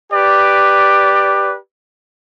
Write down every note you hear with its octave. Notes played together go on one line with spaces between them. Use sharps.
G4 B4 D5